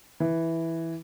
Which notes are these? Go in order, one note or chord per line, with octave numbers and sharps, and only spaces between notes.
E3